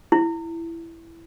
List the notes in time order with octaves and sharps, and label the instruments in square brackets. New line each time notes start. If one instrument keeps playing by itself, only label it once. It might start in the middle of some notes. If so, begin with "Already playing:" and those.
[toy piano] E4